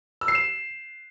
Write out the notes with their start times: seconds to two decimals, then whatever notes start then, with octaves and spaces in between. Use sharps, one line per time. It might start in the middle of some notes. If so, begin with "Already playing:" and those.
0.21 E6
0.28 C7
0.35 E7